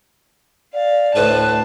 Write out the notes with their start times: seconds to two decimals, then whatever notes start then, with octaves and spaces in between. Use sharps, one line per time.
0.74 D5 F5
1.16 D2 A2 B4 C5 A5